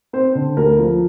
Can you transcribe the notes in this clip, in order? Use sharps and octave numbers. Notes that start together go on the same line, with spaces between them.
C4 C5
D3
D2 A#4
F3